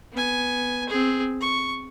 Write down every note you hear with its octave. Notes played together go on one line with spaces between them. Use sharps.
B3 G#5
C4 G#4
C#6